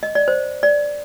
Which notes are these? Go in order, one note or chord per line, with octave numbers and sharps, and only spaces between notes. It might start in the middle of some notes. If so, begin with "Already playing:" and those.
D#5
D5
C5
D5